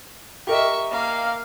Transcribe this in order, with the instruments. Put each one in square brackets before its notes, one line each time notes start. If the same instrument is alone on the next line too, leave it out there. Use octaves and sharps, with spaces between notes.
[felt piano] G4 A#4 D#5 [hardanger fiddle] E5 C#6
[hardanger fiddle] A#3 F5